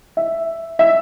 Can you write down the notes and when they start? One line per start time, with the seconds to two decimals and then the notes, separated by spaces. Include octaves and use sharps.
0.17 E5
0.79 E5